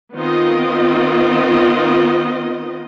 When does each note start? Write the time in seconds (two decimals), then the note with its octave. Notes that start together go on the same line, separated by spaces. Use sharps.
0.16 D#3 B3 C4 F4 D#5